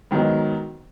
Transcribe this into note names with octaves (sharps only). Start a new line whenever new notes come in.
G#2 D#3 F#3 B3 D#4